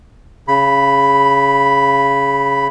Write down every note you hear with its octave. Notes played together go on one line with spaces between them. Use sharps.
C#3 B5